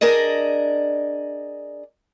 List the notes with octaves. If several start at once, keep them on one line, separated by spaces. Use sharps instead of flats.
D4 G#4 A#4 D5 D#5